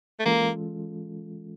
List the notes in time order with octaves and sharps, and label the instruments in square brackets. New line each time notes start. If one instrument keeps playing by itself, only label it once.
[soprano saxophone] A3
[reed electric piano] E3 G#3 C#4 F4 A4 [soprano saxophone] A#3